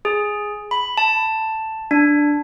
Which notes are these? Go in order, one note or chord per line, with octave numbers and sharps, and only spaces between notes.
G#4
B5
A5
D4